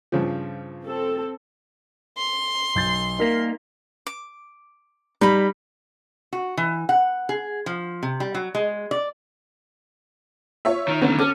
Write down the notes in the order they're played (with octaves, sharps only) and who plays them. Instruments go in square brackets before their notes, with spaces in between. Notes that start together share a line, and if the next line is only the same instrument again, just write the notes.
[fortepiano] G2 C#3 F3
[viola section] C4 A4
[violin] C6
[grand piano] B1 G6 A6
[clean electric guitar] C2 A#3 [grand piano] D#4 A#4 B6
[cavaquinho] D6
[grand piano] G3 [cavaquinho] D#4 B5
[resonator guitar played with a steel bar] F#4
E3
F#5
G#4
F3
C3
G3
F#3
G#3
D5
[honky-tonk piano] F4 C#5 E5
[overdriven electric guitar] D#3
[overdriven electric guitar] C#2 D#3 [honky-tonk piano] D3 B3 C#4
[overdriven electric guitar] C#4 [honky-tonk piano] A4 D6